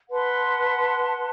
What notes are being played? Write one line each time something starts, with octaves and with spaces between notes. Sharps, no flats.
B4 F#5 A5 C6